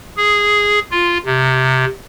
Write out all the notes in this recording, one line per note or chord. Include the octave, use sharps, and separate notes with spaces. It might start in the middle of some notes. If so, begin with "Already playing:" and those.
G#4
F4
C3